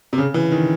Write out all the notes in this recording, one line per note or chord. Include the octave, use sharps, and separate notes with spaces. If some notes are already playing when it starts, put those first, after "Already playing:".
C3
C#3
E3
D#3